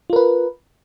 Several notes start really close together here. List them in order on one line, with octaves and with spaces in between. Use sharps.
F4 A#4 B4